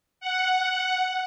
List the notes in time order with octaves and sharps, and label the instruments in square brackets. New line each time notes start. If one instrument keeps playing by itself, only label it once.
[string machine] F#5